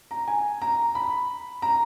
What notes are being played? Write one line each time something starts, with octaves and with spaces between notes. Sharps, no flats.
A#5
G#5
A#5
B5
A#5